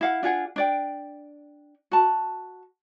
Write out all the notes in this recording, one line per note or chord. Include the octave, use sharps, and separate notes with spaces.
E4 F5 F#5
D4 F4 G#4 F#5
D4 D5 G5
F#4 A5